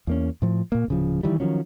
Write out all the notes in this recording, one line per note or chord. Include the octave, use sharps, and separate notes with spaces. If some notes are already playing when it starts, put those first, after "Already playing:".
E2 A#3 C#4
A2 F3
A#2 A#3
D1 C#3 F3
D#3 E3 G3
D#3 F3 F#3 C#4